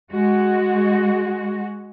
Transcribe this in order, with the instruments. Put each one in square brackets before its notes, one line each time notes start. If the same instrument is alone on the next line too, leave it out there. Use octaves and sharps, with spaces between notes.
[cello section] G#3 F#4